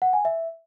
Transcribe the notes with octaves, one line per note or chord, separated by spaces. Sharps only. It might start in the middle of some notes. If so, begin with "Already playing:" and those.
F#5
G#5
E5